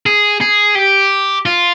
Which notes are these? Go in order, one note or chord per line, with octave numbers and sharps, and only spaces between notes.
G#4
G#4
G4
F4